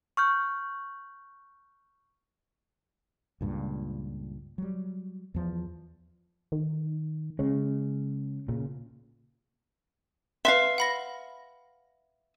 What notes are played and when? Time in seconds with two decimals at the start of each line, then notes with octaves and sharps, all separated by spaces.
0.17 C#6 F6 G6
3.41 C#2 G2 A#2
4.58 F#3 G3
5.34 E2 F3
6.52 D#3
7.39 C#3 G#3 C#4
8.48 A#2 C#3
10.45 B4 E5 F5 C6
10.78 F#5 B5 A#6